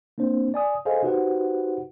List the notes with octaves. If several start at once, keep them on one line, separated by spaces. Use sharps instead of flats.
A#3 C4 D4 C5
D5 G#5 D#6
G#4 A4 C5 D#5 F5 G#5
D#4 F#4 G4 B4 C5 F#5